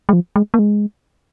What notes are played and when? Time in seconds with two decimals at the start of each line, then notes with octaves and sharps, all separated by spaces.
0.09 G#3
0.13 F3
0.36 G#3
0.54 A#3
0.59 G#3